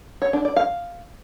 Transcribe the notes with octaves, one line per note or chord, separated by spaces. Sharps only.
C#5
D4
D5
F5